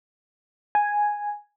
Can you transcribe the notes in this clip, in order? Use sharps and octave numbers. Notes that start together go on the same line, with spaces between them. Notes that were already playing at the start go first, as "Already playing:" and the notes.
G#5